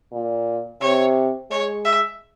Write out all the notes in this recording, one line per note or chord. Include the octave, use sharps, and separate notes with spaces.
A#2
C3 C#5
G#3 C#5
E5